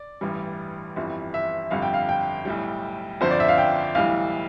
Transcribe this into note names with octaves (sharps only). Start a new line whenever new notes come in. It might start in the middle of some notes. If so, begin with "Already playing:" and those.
Already playing: D5
A1 G2 E3 G3
G1 F2 E3 G3
E5
G1 F2 D3 G3 F5
G5
F5
G5
B1 A2 G3
G1 F2 D3 F3 C5
D5
E5
F5
G5
B1 A2 E3 G3 F5